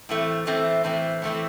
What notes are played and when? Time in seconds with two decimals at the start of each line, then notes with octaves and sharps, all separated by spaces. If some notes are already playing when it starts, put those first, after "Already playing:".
0.09 A2 E3 A3 C4
0.47 A2 E3 A3 C4
0.84 A2 E3 A3 C4
1.22 A2 E3 A3 C4